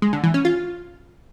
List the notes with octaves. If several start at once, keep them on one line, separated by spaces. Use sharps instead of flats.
G#3
D3
E3
C#4
F4